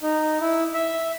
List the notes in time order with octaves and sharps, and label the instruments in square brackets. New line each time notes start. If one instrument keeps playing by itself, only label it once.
[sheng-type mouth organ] D#4
E4
E5